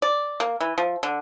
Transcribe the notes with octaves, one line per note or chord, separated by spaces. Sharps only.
D5
A#3
E3
F3
D3